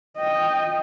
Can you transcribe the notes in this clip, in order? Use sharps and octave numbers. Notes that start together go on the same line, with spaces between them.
D#5 G5